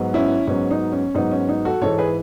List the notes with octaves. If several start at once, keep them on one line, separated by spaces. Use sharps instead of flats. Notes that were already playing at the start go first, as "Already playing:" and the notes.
Already playing: G#2 F#3 B3
C#4 E4
G#2 F#3 B3 C#4
D#4
C#4
G#2 F#3 B3 D#4
C#4
D#4
F#4 A4
G#2 E3 G#3 A4 C#5
G#4 B4